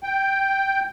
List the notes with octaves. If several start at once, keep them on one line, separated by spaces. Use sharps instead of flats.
G5